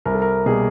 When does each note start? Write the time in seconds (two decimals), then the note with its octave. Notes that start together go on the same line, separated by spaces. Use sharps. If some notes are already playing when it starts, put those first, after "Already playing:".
0.05 C2 A#4
0.14 A4
0.22 A#4
0.46 B2 G3 A#3 G#4